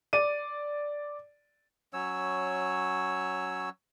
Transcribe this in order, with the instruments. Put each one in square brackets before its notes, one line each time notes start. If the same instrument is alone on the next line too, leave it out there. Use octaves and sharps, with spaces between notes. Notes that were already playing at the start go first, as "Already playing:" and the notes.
[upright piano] D5 D#7
[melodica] F#3 C#4 C#5 E6